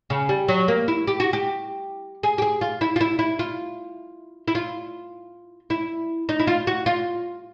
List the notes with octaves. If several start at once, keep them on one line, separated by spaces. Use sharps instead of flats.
C#3
G3
F#3
A#3
E4
G4
F#4
G4
G#4
G4
G#4
F4
E4
F4
E4
E4
F4
E4
F4
E4
D#4
E4
F4
F#4
F4